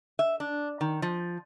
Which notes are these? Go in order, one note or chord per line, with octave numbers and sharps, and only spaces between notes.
E5
D4
D#3
F3